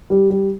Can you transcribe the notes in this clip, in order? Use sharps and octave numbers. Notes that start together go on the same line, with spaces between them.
G3
G3